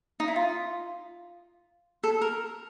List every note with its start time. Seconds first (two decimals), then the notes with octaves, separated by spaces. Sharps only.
0.20 D#4
0.28 E4
0.36 F4
2.04 A4
2.22 A#4